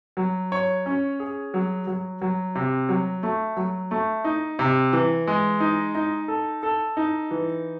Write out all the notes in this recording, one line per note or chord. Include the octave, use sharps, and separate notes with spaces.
F#3
C#5
C#4
G#4
F#3
F#3
F#3
C3
F#3
A3
F#3
A3
D#4
C3
E3
G#3
D#4
D#4
A4
A4
D#4
E3